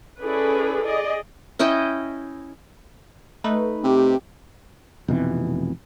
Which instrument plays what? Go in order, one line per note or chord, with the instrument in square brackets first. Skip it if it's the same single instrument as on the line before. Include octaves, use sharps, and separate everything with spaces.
[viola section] C#4 E4 G#4 A4 B4 D5
G#4 D5 D#5
[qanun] C#4 E4 D#5 G5
[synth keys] A3 D#4 B4
[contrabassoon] C3 [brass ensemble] G4
[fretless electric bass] F1 B2 E3 C4